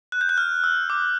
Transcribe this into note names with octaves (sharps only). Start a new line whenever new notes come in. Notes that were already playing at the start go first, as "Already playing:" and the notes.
F#6
G6
F#6
F6
E6
D6